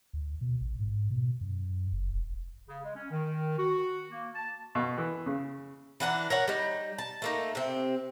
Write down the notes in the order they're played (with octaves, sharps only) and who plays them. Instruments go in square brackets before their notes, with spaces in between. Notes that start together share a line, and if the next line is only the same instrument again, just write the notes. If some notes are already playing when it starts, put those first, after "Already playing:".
[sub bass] D2
B2
A1
G#2
B2
F#2
F#1
E1
[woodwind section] C#3
G#3
C#4
D#3
F#4
A#3
A5
[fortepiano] B2
E3
C#3
[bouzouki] E3 D4 F#5 A#5
A#4 C#5 F#5
G3 D#4
A5
A3 A#3 D#4
C3 C4